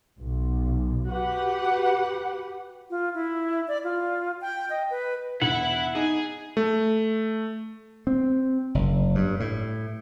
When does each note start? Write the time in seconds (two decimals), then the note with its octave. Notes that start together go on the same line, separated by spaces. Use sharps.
0.19 B1
1.10 F#4 G4 B4 F#5
2.90 F4
3.15 E4
3.68 D5
3.84 F4
4.41 G5
4.70 D#5
4.90 B4
5.42 E1 E4 E5 F#5
5.95 D#4 G#4
6.57 A3
8.07 C4
8.75 F#1
9.15 G2
9.40 A2